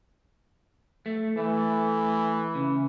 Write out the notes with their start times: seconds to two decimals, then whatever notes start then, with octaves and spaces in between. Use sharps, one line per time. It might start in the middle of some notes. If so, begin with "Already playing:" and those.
1.06 A3
1.37 E3 A3
2.55 C#3